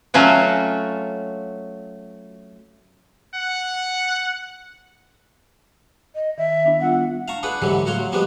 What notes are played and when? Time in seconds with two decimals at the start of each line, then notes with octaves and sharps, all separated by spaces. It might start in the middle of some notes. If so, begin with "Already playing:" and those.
0.14 F#3 A3 C#4 F4 F#4
3.35 F#5
6.15 D#5
6.38 D#3 E5
6.65 B3 D4 E4
6.81 G3 F4 F#5 E6
7.28 F5 A5 A#5 C#6
7.43 D4 G#4 B4 F#5 B5
7.62 G#2 B2 D3 E3 F#3 G3
7.86 A2 F#3 F#4 C#5 F5 C6
7.99 F#3
8.12 F3 G3 G#3 B3 D4 B4